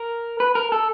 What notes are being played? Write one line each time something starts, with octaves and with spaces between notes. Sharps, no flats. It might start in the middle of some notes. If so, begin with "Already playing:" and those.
Already playing: A#4
B4
A#4
A4